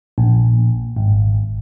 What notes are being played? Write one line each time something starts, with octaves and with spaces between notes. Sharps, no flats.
A#1
G#1